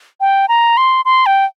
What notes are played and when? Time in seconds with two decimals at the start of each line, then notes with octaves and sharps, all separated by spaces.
0.21 G5
0.49 A#5
0.77 C6
1.05 C6
1.26 G5